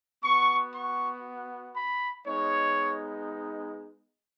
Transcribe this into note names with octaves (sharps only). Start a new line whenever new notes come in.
B3 F#4 C#6
C#6
B5
G#3 B3 D#4 C#5